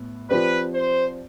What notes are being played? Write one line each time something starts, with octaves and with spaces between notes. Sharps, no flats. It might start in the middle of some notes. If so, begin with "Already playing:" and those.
Already playing: A2 B3
F3 C4 G4 B4 D5
C5